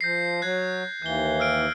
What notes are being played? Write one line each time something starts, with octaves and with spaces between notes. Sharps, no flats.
F3 G6 A#6 C7
F#3 F#6 G#6
D#2 E3 G6 G7
E6 F6 D7